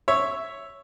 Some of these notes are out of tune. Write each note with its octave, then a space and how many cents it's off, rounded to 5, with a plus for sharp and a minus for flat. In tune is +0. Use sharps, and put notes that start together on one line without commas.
C#5 +0 E5 +0